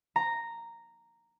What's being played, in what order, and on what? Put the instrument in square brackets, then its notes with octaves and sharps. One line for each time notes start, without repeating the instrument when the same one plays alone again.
[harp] A#5